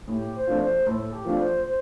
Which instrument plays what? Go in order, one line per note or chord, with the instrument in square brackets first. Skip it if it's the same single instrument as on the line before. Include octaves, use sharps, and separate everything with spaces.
[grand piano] A2 [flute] G4
[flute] C5
[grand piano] F3 A3 D4 F4
[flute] C5
[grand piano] A2 [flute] A4
[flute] G4
[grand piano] F3 A3 D4 F4
[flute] C5
C5